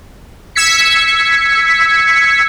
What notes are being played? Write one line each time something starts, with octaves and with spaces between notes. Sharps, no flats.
E6 G#6 B6 C#7